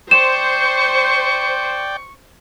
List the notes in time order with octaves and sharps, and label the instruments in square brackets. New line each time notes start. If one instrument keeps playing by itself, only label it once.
[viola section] C5 [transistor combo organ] D5 G5 [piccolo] C#6 [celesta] E7